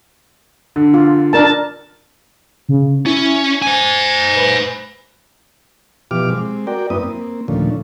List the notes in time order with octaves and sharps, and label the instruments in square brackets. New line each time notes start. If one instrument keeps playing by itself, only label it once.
[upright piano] D3
[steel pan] F4
D4 A#4 A5
[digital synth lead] C#3
[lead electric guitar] C#4 [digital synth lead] E4
[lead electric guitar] C5 G#5 [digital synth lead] G#6
[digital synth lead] B4
[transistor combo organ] B2 E3 F3 G4 D6 F6
G#3 C4
F#4 A#4 D5 G5
F#2 A#3 C4 E4 B4 D#6
A#3 C4
D#2 A#2 D3 F3 A3 C#4